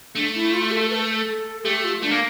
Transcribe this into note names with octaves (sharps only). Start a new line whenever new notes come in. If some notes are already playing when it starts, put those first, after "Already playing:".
A3 D4
E4
F4
A4
B4
A4
A4
A3 G4
F4
A3 D4
A#3